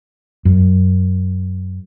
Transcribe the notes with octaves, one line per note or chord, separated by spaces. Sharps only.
F#2